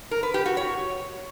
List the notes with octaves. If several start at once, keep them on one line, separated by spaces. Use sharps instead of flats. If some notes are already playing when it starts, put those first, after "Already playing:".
A#4
B4
G4
F#4
C#5